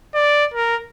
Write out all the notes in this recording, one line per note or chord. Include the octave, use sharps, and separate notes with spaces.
D5
A#4